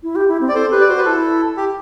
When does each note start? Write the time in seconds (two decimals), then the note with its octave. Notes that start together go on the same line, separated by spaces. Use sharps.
0.03 E4
0.16 G4
0.28 E4
0.41 C4
0.49 D5
0.54 A4 C5
0.71 G4 B4
0.81 D5
0.88 F#4 C5
0.98 B4
1.05 E4 A4
1.57 G4